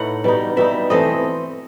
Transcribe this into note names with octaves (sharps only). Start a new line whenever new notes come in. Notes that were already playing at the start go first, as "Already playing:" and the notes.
Already playing: A2 D#4 A4 B4 F#5
B2 G3 D#4
B2 G3 D#4 E5
E3 A3 C4 D#5